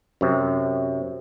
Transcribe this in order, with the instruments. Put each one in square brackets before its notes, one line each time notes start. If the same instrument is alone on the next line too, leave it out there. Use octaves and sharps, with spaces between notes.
[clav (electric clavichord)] F#2 C3